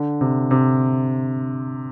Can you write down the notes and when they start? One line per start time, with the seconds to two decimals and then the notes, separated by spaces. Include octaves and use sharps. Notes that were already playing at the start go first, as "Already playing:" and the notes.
Already playing: D3
0.21 C3
0.51 C3